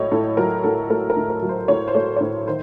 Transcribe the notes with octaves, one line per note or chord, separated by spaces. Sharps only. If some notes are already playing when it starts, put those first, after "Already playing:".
Already playing: A2 F#3 A3 C#5 D#5
A2 A4
F#3 A#4
A2 A4
A3 A#4
A#4
A2
A#4
F#3
C5
A2 C#5
C5
A3 C#5
C#5
A2 C5
D#3 C5